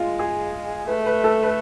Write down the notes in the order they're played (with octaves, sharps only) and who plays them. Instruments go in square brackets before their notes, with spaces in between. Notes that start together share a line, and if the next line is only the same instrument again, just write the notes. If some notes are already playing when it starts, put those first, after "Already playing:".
Already playing: [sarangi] G#3 [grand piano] F4
[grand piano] G#4
[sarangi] A3 [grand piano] B4
[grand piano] B4
A4
B4